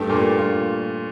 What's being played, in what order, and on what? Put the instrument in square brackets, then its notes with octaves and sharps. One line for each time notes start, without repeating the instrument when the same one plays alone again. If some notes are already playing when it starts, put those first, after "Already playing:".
Already playing: [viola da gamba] G2 [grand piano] A3
[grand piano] A#2
F4